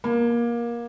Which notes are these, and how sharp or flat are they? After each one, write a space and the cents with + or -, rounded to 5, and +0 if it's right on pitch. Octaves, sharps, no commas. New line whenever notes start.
A#3 +20